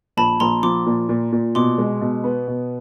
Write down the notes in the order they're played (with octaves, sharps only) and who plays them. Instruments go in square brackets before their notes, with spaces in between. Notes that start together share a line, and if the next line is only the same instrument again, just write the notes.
[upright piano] A#1 [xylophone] A5 B5
[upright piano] A#1 [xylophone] A#5 C6
[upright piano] F3 [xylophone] C6 D6
[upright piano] A#2
A#2
A#2
[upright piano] B2 [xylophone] C6 D6
[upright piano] G#3
B2
B3
B2